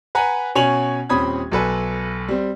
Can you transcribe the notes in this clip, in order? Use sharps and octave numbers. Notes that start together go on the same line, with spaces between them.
B4 F#5 G#5 A#5 B5
B2 C#4 C#5 G#5 F7 F#7
D#1 C4 C#4 B5 D#6 G#6
B1 A4 B4 G#5
G3 C4